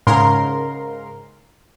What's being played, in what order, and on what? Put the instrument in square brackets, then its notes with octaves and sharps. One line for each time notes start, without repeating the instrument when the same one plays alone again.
[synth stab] G#2 C#3 A#4 C6